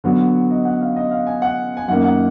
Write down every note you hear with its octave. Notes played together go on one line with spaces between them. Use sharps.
D3 F#3 B3
D#5
F#5
F5
D#5
F5
G#5
F#5
G#5
F#2 D#3 A#3 F#5
F#5